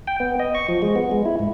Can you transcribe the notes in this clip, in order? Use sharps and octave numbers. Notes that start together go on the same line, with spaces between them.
G5
B3
D#5
C#6
F3
G#3
B3
G#3
E4
G#2